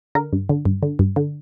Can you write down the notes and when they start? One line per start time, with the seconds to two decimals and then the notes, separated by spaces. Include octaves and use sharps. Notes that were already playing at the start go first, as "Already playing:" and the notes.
0.15 D3 A#4
0.33 G2
0.49 D3
0.65 G2
0.83 D3
0.99 G2
1.16 D3